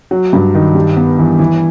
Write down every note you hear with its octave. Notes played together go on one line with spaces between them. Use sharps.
F#3
G2
D#3
G3
B3
E3
E3